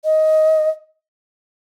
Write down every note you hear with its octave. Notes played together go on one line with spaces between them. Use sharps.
D#5